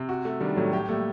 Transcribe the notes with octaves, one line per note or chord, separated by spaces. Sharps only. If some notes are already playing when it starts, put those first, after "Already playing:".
Already playing: C3
F#4
A3
D#3 G3 D4
A2 F#3 A3
F#3 A3 G4
G3 A3 A#3